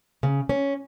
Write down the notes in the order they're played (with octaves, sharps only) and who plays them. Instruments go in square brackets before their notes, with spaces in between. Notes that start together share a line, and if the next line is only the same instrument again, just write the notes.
[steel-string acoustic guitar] C#3
C#4